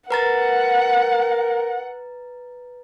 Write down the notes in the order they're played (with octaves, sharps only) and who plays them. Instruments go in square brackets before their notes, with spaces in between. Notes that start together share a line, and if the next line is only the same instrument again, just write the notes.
[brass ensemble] A#4 [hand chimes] B4 A#5 A6 [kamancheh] F#5